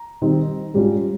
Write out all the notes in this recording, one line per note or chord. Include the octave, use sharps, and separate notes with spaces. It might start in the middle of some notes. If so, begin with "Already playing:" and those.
Already playing: A#5
D#3 G3 C4 D#4
G#2 G3 C#4 F4